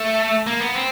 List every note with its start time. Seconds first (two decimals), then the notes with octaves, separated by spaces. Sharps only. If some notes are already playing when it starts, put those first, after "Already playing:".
Already playing: A3
0.46 A#3
0.61 B3
0.75 C4